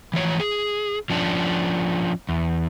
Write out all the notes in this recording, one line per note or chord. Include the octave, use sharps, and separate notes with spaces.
E3 F3 C#5
G#4
F3 C#4 D4
E2